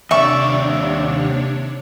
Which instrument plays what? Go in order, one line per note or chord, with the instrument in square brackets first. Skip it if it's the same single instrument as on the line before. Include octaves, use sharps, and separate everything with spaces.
[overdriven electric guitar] D#2 D5 [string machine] C3 D4 C#5 [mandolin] E5 C#6